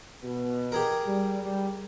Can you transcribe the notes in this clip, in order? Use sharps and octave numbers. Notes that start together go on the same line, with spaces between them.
B2
G4 G#4 A#4
G3
G3